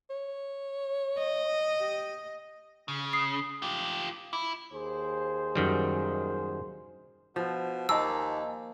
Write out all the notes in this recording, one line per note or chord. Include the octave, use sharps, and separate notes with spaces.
C#5
D#5
G4
C#3
D#6 C7
F4 G4
E4 D6
D#2 G#4 C5
F#2 D#3 G3
B2 F3
D#2 A#3 D#5 G#5 A5 E6